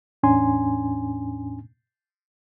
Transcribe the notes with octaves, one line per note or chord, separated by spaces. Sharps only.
E2 A2 C#4 D4 G#5 C6